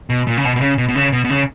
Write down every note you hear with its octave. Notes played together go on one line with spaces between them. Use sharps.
B2
A#2
C#3
B2
B2
C#3
B2
B2
C#3
B2
B2
C#3